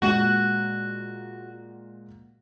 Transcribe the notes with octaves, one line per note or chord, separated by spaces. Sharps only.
A#2 G#3 F#4 F#6